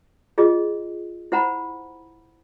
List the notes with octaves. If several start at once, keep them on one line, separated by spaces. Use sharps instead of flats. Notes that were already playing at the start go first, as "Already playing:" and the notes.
F4 G#4 D#5
E4 C5 F#5 A#5 B5